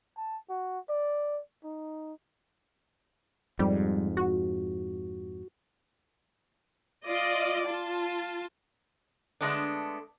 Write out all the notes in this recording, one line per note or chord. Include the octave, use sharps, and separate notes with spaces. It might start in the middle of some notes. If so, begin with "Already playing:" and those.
A5
F#4
D5
D#4
F2 G#2 G3
F#4
F4 D5 D#5
F4 A5
D3 G#3 A3 B3 D4